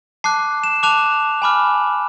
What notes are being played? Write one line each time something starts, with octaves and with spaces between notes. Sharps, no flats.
A5 D6 F#6 C7
E7
A5 D6 F#6 F7
G#5 B5 D6 F6